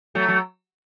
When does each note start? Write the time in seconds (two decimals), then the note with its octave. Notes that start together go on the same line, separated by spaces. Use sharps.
0.15 F#3 A3
0.28 F#3